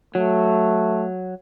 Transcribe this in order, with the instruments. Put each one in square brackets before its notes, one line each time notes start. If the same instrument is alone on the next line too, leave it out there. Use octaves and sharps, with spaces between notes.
[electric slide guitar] F#3 [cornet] A3